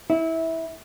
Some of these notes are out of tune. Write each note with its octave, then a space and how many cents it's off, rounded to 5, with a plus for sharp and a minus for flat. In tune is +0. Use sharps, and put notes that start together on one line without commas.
E4 -20